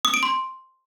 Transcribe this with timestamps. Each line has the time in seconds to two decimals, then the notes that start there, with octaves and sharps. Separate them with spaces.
0.05 D#6
0.14 D7
0.23 C6